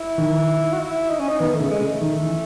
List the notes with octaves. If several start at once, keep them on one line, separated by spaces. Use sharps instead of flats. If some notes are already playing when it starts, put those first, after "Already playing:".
Already playing: E4
D#3
F#4
E4
D#4
C#4
D#4
D#3 B3
A3
C#3
G#3
C#3
A3
D#3
E3